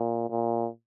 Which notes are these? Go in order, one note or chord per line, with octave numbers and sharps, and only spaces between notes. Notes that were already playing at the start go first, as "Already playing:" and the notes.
Already playing: A#2
A#2